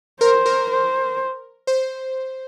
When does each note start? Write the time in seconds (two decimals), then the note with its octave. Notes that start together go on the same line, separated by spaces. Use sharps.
0.21 A#4 C5
0.46 A#4
0.70 C5
1.67 C5